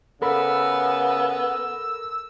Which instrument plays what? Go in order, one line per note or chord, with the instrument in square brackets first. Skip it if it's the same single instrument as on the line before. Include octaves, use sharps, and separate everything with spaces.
[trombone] C#3 [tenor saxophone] B3 [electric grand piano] A4 A#4 B5 [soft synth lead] E6